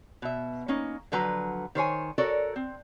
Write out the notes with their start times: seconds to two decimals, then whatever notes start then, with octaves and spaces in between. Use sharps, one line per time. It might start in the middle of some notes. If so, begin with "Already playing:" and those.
0.22 B2 E5
0.68 A#3 C#4 D#4
1.12 D3 F3 F#3 B4 A#5
1.75 D#3 C5 C#5 G#5
2.18 F#4 A4 A#4 C#5 D5
2.56 C4